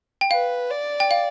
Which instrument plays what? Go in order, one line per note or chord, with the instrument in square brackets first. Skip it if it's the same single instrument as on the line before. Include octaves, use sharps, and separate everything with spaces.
[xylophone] G5
[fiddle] B4 [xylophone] F5
[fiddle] D5
[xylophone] G5
F5